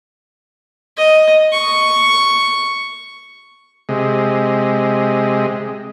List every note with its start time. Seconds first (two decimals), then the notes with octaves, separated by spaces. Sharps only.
0.97 D#5
1.52 C#6
3.89 C3 G#3